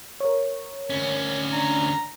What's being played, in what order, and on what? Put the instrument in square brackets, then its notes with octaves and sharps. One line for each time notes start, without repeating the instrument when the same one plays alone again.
[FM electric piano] A#4 C#5
[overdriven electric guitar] D2 C#4
[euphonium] D4 [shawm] A#5